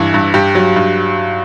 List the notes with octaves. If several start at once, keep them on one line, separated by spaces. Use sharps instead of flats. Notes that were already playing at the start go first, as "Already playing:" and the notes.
Already playing: G2 E3 E4
G2
G2 G4
F#3
G2